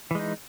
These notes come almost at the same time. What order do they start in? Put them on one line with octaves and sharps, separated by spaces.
E3 G#3 D#4